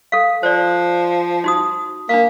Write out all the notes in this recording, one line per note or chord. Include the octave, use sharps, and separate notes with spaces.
A4 F5
F3 C5 D5
D#4 F#4 D#6
A#3 D4 F5